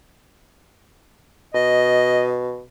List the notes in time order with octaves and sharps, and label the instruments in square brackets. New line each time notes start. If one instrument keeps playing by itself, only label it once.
[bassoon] B2 [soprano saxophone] D#5